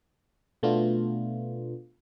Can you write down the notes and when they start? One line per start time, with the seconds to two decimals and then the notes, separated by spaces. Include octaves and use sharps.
0.63 B2 A3 B3 D4 F4